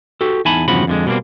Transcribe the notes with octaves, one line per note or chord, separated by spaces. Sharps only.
F#4 G4 A4
E2 D#4 G#5 A5 B5
E2 G2 C#3 F3 F#4 B5
F2 D3 G#3
B2 G3 A3 A#3 C4